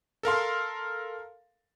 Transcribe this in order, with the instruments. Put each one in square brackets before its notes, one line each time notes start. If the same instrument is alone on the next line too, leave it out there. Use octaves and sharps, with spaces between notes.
[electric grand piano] A4 A#4 F5 C6